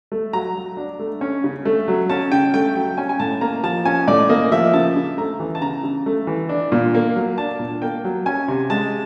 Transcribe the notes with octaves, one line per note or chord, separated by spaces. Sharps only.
A3
F#3 A#5
F#3
D4
A3
C#4
C#3
A3
F#3
C#4 A5
C#3 G5
A3 G5
F#3 G5
C#4 G#5
G#5
A2 A5
A#3 A#5
F3 A5
C#4 G#5
A2 D5
A#3 D#5
F3 E5
C#3 A5
C#3
A3 A#5
E3
A5
C#3 A#5
C#3
A3
E3
D4
A#2
A#3
F#3
D4 A5
A#2
A#3 G5
F#3
C#4 G#5
C3
G#3 A5